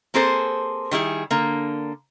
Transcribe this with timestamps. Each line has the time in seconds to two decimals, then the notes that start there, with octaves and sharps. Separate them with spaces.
0.14 A#3 C4 G#4 A4 C5
0.91 D#3 G3 E4 G#4
1.31 D3 A#3